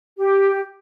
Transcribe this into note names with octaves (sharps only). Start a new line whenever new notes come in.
G4